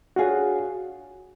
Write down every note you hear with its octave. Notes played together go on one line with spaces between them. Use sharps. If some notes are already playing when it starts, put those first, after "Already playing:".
D4 F4 F#4 G#4 C#5